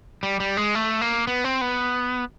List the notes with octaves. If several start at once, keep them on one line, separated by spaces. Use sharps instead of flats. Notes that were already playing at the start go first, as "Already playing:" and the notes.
G3
G3
G#3
A3
A#3
B3
C4
B3